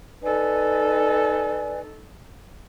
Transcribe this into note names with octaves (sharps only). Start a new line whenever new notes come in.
D#4 A4 B4 D5 G#5